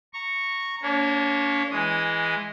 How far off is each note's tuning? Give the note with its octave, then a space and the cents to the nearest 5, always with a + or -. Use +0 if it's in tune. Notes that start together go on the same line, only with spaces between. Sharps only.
A#5 -10 C#6 -5
A#3 +0 D4 -45 C#5 -10
E3 +0 G#3 +0 D#6 +0